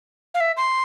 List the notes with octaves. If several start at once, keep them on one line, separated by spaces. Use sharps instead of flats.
F5
E5
C6